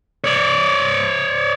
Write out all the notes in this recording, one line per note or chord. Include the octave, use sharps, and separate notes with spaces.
C#5 D5